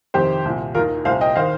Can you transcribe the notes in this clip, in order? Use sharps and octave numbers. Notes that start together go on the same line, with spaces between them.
F2 C3 D#3 G4 C5
C2 A#2
D#2 D#3 F4 A#4
C2 A#2 C5 F5
D#5 G5
D#3 C5 F5